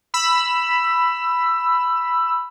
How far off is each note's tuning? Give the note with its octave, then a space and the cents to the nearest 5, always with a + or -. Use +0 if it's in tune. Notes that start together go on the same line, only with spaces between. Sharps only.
B5 +0 E6 +15